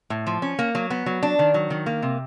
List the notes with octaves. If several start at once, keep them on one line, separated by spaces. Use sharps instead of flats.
A2
F3
C#4
A#3
F#3
B3
F#3
D4
D#3
F#3
D#3
A#3
C3